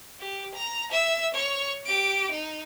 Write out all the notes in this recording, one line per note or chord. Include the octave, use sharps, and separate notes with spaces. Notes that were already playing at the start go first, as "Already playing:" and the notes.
G4
A#5
E5 E6
C#5 C#6
G4 D7
D#4